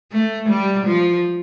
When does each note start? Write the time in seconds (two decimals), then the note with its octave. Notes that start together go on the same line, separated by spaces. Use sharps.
0.12 A3
0.49 G3
0.87 F3